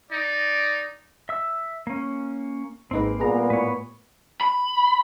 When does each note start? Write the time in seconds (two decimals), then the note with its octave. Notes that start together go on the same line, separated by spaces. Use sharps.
0.11 D#4 D5
1.29 E5 E6
1.87 A#3 C#4
2.91 G#1 G#2 A#3 C4 D#4 B4
3.20 A#2 G3 B3 G#4 B4 A#5
3.50 A2 B4 C#5
4.41 B5